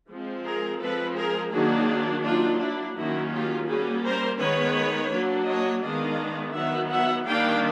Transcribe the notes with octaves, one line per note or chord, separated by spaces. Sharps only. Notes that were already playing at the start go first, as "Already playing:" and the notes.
F3 G#3 C4
G#4 A#4
F3 G#3 C4 A4 B4
G#4 A#4
D#3 F#3 A#3 D4 F#4 G#4
F#3 A#3 D4 D#4 F4
D4 E4
D#3 F#3 A#3 C#4 E4 F#4
F4 G4
G3 A#3 C#4 F#4 G#4
A#4 C5
D#3 G#3 B3 B4 C#5
F#3 A#3 D4
C#5 D#5
D#3 G#3 B3 D4 D#5 F5
D#3 F#3 B3 E5 F#5
E5 F#5
D#3 G3 A#3 D4 F5 G5